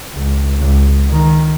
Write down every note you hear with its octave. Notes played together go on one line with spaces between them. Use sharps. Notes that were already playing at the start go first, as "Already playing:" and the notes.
C#2
C#2
D#3